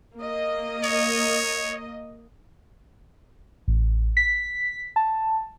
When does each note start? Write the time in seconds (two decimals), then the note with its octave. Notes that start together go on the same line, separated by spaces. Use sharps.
0.17 A#3 D#5
0.83 C#5
3.68 A1
4.17 B6
4.96 A5